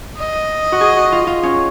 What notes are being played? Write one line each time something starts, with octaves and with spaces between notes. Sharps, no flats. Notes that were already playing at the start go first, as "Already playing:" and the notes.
D#5
F#4
G#4
F#4
F4
F4
C#4